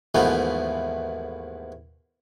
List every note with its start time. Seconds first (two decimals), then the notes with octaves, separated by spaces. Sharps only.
0.15 D#2 G#2 E3 F3 A3 B3